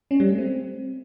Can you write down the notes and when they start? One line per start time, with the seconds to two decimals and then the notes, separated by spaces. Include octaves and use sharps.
0.11 C#4
0.20 G3
0.29 A3
0.38 C4